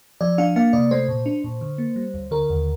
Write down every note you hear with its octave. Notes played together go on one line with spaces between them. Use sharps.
F3 D5
D4 F5
A#3 F5
C3 D5
A3 C5
A#2
D4
A#2
D3
A#3
G3
D2
D3 A#4
D#2